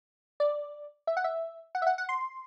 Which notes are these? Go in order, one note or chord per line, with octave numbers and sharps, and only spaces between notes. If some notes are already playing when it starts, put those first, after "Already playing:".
D5
E5
F#5
E5
F#5
E5
F#5
F#5
C6